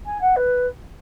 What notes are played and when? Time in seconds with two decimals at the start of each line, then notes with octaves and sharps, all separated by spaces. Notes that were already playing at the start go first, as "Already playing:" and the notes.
0.06 G#5
0.21 F#5
0.36 B4